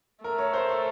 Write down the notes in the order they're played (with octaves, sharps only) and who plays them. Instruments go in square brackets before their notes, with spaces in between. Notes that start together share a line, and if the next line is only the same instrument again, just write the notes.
[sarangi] A3 [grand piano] A#4
[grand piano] C#5
C5
A4